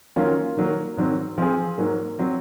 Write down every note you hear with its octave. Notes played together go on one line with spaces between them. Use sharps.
D#3 F#3 A#3 C#4 F4
D#3 F#3 A#3
G#2 D#3 F#3 C4
F3 C4 F4 G#4
G#2 F#3 A#3
F#3 C4